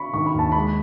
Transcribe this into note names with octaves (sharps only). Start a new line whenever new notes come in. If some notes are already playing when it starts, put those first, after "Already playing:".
Already playing: B5 C#6
D#3 C#6
B5
D#2 A5
G#3 B5